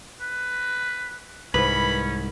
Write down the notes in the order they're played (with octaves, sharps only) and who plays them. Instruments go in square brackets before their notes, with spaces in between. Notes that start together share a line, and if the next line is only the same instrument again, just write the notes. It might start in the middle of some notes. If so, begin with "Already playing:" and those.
[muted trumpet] B4
[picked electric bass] C2 G#2 [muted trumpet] C#4 [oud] B4 [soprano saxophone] B5